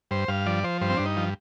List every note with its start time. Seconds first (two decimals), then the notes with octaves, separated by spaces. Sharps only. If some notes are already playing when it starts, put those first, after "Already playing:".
0.11 G2 C5
0.28 G2 F5
0.46 F3 D5
0.64 F3 C5
0.81 G2 C5
0.90 C4
0.97 G2 D4
1.06 D#4
1.17 F3